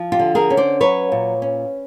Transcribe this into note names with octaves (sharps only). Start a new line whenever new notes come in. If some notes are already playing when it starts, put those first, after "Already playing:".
Already playing: F3
F4 G4
D3
G#4 A#4
C#4
C5 D5
F#3 B4 C#5
A#2
C#4